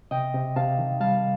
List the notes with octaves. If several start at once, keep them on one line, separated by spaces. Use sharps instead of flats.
C3 D#5 G5
C3
C3 F5 A5
D#3
G3 F5 A5